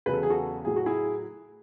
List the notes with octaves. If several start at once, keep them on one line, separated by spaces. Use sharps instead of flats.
E2 C#3 F#3 B4
A4
G#4
F#4 A4
A2 F#3 A3 G#4
F#4
E4 G#4